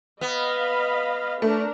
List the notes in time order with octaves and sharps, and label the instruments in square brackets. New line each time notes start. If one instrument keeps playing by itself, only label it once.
[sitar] B3 [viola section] D#5 F5 B5
[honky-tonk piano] A3 [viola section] D4 A#4